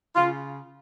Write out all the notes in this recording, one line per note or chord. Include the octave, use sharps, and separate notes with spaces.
C#3 F4